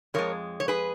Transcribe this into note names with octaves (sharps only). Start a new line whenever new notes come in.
F2 F3 G#3 A#4 C#5
C#5
G#4 B4